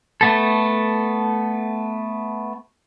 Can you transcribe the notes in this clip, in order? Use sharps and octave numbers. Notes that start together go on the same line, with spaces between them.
A3 B3 A4